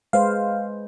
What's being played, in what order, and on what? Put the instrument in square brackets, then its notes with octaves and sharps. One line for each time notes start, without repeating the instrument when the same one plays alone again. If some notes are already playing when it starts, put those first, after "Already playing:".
[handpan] G#3 B4 C5 [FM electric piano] F5